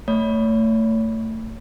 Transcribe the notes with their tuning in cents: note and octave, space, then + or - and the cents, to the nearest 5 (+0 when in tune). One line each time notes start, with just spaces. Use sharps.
A3 +25 C#5 +30